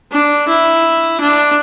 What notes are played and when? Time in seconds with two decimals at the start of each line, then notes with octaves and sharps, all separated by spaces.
0.11 D4
0.48 E4
1.21 D4